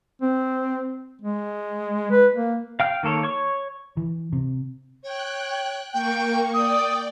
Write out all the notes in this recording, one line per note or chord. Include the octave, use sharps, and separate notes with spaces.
C4
G#3
B4
A#3
F5 G5 F6
D#3 A#3 A4 C#5
C#5 C#6
E3
C3
C#5 G5 F#6
A#3 G5 C#6
D5 G5 D#6